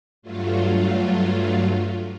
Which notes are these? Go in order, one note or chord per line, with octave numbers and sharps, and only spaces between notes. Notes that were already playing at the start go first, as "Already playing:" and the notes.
G2 F#3 A3 F4